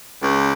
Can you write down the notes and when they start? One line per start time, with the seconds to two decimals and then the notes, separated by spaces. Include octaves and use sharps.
0.22 C#2